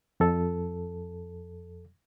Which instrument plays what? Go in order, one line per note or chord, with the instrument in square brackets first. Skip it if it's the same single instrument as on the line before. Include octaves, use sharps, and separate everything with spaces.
[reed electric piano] F2 A4